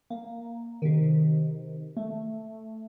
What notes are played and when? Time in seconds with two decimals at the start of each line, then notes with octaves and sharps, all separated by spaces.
0.10 A#3
0.82 C3 D#3
1.97 A3